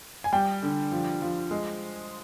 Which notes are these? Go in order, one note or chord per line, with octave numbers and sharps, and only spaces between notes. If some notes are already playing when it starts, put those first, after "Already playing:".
G#5
G3 G5
D3
F3
F3
G#3